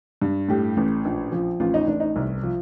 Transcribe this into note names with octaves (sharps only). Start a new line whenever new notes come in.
G2
A2 G4
A1
A#1
F3
A1 F4
D#4
A1 D4
D#4
C2
F3